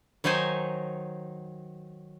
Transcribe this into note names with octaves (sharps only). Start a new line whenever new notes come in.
D#3 F#3 D#4 C5 G#5